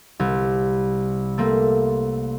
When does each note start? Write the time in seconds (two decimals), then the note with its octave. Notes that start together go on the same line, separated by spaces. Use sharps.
0.20 C2
1.38 A3 A#3 C4